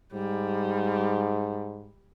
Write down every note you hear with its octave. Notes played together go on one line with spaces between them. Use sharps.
G#2 G3